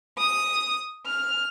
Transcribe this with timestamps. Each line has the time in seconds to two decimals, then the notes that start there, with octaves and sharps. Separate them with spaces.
0.18 D#6
1.05 F6